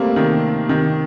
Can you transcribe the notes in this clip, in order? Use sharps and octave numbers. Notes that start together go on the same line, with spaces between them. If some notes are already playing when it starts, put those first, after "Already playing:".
Already playing: G3 A3 A#3 C4
C3 D#3
C3 D#3